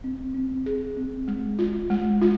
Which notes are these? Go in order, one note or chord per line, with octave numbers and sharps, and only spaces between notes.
C4
C4
G#4
C4
G#3
F4
G#3
F4